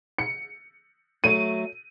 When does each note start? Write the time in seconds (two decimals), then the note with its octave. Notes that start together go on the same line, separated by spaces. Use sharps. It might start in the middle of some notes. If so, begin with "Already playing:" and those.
0.18 C#7
1.24 F#3 A3 D#7